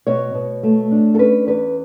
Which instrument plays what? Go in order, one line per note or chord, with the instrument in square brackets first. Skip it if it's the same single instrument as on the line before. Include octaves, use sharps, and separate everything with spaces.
[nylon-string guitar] B2 C#5
B2
A3
D4
A4
C#4 B4
E2 B4